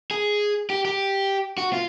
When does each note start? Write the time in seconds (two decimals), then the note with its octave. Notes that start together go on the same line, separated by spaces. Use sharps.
0.11 G#4
0.70 G4
0.85 G4
1.58 F#4
1.73 F4